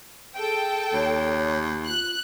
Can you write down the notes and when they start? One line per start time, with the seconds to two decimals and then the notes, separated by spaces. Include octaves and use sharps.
0.36 G#4 A4 G5
0.94 D#2 C#5
1.86 F4 F#6